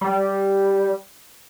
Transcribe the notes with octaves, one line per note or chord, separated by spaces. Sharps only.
G3